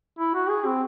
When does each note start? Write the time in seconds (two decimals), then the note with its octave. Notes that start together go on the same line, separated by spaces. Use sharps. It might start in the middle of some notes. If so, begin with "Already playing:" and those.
0.19 E4
0.35 F#4
0.49 G#4
0.66 C4